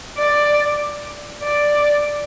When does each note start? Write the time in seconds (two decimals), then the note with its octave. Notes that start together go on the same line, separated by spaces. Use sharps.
0.18 D5
1.43 D5